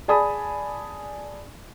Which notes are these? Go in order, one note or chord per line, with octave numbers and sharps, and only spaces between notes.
G#4 D5 G#5 A5 B5 D#6